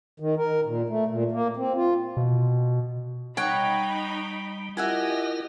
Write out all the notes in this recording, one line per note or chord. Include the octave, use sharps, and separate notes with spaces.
D#3
A#4
A#2
A3
A#2
A#3
C4
F4
B2
G3 D#4 C#5 F#5 G5 B5
E4 F4 G4 A#4 D#5 E5 F#5 G#5